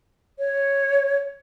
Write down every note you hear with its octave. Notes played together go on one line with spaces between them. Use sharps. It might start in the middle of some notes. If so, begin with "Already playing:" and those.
C#5